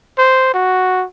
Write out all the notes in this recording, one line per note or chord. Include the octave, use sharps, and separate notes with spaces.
C5
F#4